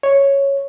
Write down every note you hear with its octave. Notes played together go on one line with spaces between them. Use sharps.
C#5